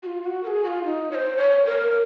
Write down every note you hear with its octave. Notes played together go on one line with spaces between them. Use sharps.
F#4
F4
F#4
A#4
G#4
F#4
F4
D#4
C#5
C5
C#5
A#4